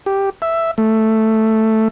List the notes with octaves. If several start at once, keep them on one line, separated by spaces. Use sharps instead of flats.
G4
E5
A3